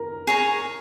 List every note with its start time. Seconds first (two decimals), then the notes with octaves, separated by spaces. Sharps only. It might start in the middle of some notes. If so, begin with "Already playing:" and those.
Already playing: A#4
0.27 G#4 C#5 A#5